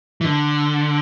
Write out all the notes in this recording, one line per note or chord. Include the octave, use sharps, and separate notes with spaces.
E3
D3